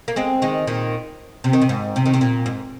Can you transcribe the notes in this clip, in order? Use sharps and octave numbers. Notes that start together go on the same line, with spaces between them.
A#3
G#3 C4
D#3 G#3
A#2 D#3
C3
D#3
C3
G#2
C3
D#3
C3
A#2
G#2